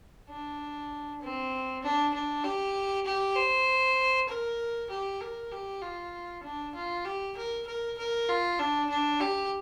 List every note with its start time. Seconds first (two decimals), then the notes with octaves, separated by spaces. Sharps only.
0.29 D4
1.22 C4
1.83 D4
2.14 D4
2.44 G4
3.06 G4
3.36 C5
4.29 A#4
4.90 G4
5.21 A#4
5.52 G4
5.82 F4
6.44 D4
6.75 F4
7.05 G4
7.37 A#4
7.67 A#4
7.98 A#4
8.29 F4
8.59 D4
8.90 D4
9.20 G4